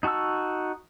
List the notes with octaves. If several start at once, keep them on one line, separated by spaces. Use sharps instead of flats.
D#4 F#4 A5 C#6 E6